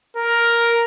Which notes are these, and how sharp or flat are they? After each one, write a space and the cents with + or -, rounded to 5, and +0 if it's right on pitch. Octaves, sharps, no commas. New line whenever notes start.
A#4 +5